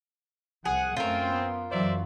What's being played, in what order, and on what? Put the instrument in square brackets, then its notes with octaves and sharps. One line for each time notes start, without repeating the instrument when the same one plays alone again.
[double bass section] C2 F3 [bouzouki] G#4 [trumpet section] F#5
[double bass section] F#2 A3 C#4 [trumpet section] C4 [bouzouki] F4 A#4
[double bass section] B3
[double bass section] F#2 E3 F#3 [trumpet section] C5 D5 E5